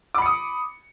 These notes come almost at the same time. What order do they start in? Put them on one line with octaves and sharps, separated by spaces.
D6 B5 C#7 D#6